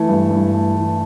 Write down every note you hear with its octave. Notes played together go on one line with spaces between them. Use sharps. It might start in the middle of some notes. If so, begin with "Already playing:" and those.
Already playing: E3 A3
G2
G2
A3
E3